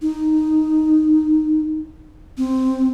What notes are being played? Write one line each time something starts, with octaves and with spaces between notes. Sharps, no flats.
D#4
C4